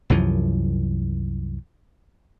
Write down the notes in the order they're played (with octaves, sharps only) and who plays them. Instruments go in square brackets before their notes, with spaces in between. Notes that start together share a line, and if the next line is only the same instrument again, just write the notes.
[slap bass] C2 F#2 E3 F3